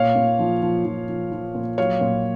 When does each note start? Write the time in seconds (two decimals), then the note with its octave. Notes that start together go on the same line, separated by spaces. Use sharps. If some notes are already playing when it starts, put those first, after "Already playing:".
Already playing: A#2 C#5 F5
0.16 A#2
0.39 F3
0.62 F3
0.85 F3
1.08 F3
1.32 F3
1.55 A#2
1.78 F#3 C#5 F5
2.01 A#2